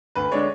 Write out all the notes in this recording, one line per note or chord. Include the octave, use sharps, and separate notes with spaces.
D2 B4
D3 G#3 D4 C#5